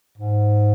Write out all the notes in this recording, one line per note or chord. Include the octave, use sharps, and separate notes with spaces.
G#2